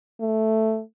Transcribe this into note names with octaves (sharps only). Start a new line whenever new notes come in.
A3